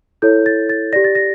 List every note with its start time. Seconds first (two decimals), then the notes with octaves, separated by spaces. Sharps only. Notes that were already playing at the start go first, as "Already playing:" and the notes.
0.22 E4 A4 C#5 G6
0.46 A6
0.69 A6
0.93 G4 D5 A#6
1.04 A6
1.15 A#6